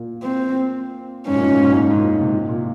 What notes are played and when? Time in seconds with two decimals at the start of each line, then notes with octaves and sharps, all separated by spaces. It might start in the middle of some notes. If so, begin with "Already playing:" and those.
Already playing: A#2
0.23 C4
1.27 G#2 C#4
1.35 A#2
1.44 G#2
1.51 A#2
1.58 G#2
1.67 A#2
1.74 G#2
1.82 A#2
1.90 G#2
1.98 A#2
2.05 G#2
2.21 C3
2.32 A#2
2.49 A#2